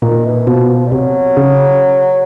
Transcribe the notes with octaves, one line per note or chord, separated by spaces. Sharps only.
A#2 D#3
E3
B2 F3
F3
G3
C3 F#3
C#3